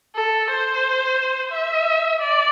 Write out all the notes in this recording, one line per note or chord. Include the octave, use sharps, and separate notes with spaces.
A4
C5
E5
D5